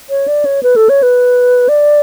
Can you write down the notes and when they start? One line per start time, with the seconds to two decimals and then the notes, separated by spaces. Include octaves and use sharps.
0.10 C#5
0.28 D5
0.45 C#5
0.63 B4
0.76 A4
0.89 C#5
1.03 B4
1.69 D5